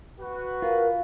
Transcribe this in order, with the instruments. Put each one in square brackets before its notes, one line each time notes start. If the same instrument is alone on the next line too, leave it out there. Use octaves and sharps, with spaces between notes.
[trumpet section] F#4 B4
[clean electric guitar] F4 [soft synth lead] A#4